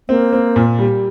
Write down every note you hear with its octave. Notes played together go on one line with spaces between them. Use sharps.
A#3 C4
C4
A#2
G3